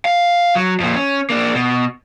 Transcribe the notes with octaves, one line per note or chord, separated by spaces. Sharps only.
F5
F#3
F2 A#2
C#4
A#3 D4
B2